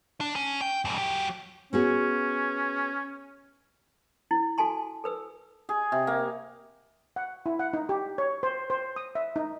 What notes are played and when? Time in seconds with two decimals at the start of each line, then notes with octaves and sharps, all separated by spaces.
0.21 D4
0.36 C#4
0.61 G5
0.85 F2 G#2
0.98 F#3 G4
1.73 B3 C#4 F#4 G#4
4.31 E4
4.58 F#4 A4 G#5 A5 C6
5.04 A4 B4 E6
5.69 G#4
5.92 C3
6.07 A#3
7.16 F#5
7.46 E4
7.59 F#5
7.73 D#4
7.89 G4
8.18 C#5
8.43 C5
8.70 C5
8.96 D#6
9.15 E5
9.36 D#4